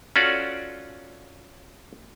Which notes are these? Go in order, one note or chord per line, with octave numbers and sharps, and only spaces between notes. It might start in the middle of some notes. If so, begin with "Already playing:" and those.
C#4 F4 F#4 A4 D5